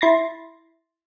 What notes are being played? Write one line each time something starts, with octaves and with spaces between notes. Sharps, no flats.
E4 C6 A6 A#6